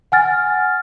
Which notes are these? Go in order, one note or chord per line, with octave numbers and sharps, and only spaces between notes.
F#5 G#5 F6 A6